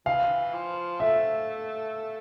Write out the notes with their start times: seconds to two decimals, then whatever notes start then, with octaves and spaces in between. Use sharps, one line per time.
0.06 E3 F5
0.53 F3
1.00 A3 E5